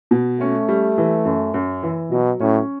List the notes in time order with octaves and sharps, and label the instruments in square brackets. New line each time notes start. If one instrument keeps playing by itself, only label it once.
[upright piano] B2
[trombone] A3 [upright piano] C#4
[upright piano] G3
E3
F#2
F#2
E3
[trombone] B2 [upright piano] F#3
[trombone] A2 [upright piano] C#4